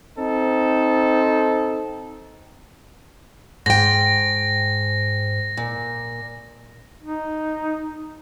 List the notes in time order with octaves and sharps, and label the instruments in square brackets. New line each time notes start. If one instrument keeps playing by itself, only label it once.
[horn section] C4 D#4 A4
[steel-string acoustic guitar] G#2 G5 [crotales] A#6
[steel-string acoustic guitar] A#2
[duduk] D#4